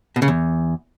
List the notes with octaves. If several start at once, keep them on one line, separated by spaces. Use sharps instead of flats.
B2
C#3
E2